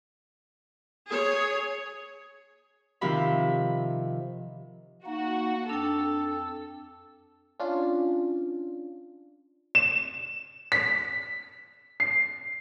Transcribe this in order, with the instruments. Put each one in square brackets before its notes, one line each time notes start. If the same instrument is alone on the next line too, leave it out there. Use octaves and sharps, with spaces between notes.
[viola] G#4 C#5
[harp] C3 D#3 F3 G4 E5 B5
[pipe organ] A#3 D#4 [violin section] F#4
[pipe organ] F2 E6 [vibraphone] D4 G5 [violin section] A4
[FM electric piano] C#4 D4 F4
[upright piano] E7
B6
C7